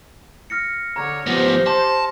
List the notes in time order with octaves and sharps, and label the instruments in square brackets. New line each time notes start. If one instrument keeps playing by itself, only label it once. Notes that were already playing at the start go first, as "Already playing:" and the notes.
[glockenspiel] F6 A#6 C#7
[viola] D3 C#5 [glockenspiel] A#5
[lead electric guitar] F3 B3 [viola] G4 C5 [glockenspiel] A#6
[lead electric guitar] A5 [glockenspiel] C6